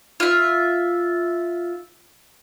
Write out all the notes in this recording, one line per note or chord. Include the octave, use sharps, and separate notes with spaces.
F4 E5